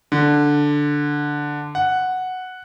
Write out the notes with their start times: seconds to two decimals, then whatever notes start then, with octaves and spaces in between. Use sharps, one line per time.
0.12 D3
1.75 F#5